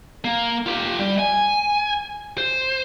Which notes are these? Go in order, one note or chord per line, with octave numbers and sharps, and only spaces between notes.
A#3
F4 G4
G3
G#5
C5